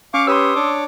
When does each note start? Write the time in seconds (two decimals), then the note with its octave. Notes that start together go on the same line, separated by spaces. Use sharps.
0.14 C#4 F5 C#6 D6
0.27 G4 B4 C#5 C6 D#6 E6
0.55 D4 C#5 D6